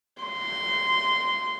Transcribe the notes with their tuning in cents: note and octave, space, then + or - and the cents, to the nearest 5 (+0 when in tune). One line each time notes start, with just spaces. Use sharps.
C6 -15